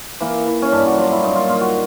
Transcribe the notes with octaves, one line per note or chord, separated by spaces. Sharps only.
E3 A#3
E3
C#4
G2 D4
F#4
F#3 F4
E4
A#2 D#4
F4
A#2 F4
F#4